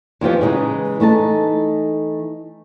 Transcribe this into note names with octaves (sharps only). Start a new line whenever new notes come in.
F2 E3 F3 G4
C#3 E3 G#3 D#4 G#4
E3 A3 D#4 A5